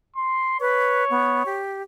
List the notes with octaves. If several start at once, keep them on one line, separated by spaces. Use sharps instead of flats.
C6
B4 C#5
B3
G4